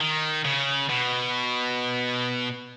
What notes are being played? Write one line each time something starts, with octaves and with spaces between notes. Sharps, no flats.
D#3
C#3
B2